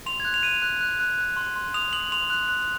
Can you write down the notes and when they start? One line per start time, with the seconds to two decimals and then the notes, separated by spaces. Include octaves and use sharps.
0.06 C6 F7
0.20 F#6 G#6
0.34 F7
0.43 F#6 D#7
0.49 F7
0.62 F#6
0.81 F#6
1.00 F#6
1.18 F#6
1.37 C6
1.56 C6
1.74 D#6 F7
1.93 D#6 F#7
2.12 C6 F7
2.30 F#6
2.49 F#6